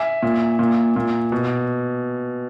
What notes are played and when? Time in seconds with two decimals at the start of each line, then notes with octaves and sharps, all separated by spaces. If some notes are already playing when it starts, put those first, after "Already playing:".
Already playing: E5 G#5
0.23 A#2
0.59 A#2
0.96 A#2
1.32 B2